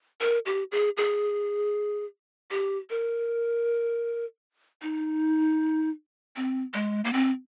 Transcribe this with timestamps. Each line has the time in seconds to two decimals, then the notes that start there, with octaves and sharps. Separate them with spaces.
0.21 A#4
0.46 G4
0.72 G#4
0.97 G#4
2.51 G4
2.90 A#4
4.82 D#4
6.36 C4
6.74 G#3
7.05 A#3
7.13 C4